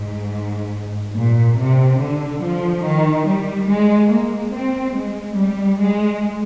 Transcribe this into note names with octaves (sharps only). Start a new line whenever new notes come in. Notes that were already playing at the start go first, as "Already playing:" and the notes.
Already playing: G#2
A#2
C3
D3
F3
D#3
G3
G#3
A#3
C4
G#3
G3
G#3